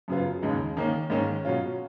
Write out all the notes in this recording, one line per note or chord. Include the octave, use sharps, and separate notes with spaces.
F#2 C#3 F#3 B3 F4
D#2 C#3 G#3 D#4
D#3 A#3 C#4
G#2 D#3 A#3 C#4
B2 F#3 C#4 F4